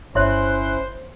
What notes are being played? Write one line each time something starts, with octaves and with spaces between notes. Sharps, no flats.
G1 C#4 E4 C5 C#5 E5 C6 F#6